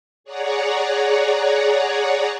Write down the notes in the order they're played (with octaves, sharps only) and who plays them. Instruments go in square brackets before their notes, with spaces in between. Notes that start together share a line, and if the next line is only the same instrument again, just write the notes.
[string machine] G#4 C#5 D5 F#5 A#5